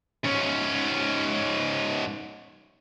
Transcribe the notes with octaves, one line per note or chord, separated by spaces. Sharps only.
G#2 C#4